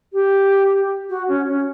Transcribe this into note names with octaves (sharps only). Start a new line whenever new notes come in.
G4
F#4
C#4
C#4